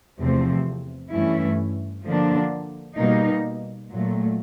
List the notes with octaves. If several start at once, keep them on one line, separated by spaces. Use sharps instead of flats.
E2 C3 F3 A3 C4
G2 E3 A3 C#4 E4
D3 F3 A#3 D4
B2 G3 A#3 D#4
A#2 F#3 A3